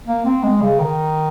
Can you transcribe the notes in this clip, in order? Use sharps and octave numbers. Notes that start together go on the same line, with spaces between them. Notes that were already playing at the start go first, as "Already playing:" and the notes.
A#3
C4
G#3
C#3
D#3